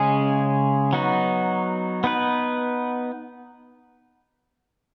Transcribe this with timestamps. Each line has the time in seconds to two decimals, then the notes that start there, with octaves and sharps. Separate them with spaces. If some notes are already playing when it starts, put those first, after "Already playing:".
Already playing: C#3 G#3 C#4 G#4
0.93 F#3 B3 D#4 F#4
2.04 B3 D#4 B4